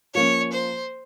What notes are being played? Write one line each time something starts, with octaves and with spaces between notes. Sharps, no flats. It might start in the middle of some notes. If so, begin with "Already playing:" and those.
F3 A#3 C#4 C#5
C5